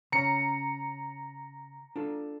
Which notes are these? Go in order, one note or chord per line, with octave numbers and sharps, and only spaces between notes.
C#3 C#4 C#5 A#5 C#7
D4 F4 A4